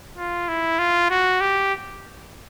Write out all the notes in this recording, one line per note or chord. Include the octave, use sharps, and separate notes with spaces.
F4
E4
F4
F#4
G4